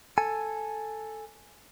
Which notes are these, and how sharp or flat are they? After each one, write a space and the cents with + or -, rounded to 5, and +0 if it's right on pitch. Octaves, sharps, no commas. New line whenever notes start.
A4 +0 G#5 +0